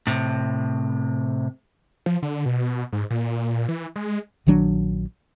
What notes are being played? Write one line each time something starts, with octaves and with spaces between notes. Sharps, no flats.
A2 C3
F3
D3
B2
G#2
A#2
E3
G#3
A#1 D#3 F#3 D4